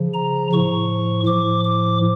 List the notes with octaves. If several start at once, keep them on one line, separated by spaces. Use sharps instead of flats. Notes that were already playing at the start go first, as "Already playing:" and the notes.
Already playing: C#3 F3
A#5
A2 F3 C#6
A2 F3 D6
D6